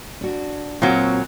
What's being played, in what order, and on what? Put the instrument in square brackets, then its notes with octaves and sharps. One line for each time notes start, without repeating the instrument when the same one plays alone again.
[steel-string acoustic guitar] D4 F#4
[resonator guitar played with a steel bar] A#2 F#3 [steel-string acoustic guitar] C4 F#4 F#5